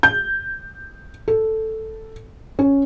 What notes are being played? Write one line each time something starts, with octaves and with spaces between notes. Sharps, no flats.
G6
A4
C#4